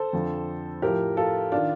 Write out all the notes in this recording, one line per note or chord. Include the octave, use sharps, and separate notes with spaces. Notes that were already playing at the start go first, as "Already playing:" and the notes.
Already playing: A4 C5
F2 D3 F3
A2 F3 G4 A#4
F4 A4
D#3 D4 F4